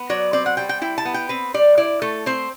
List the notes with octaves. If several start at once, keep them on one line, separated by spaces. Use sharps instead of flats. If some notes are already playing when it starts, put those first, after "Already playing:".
Already playing: B3
F#3 D5
C4 D5
F#5
G3 G5
G5
E4 G5
A5
B3
G5
C4 B4
G3 D5
E4 D5
A3 A4
C4 C5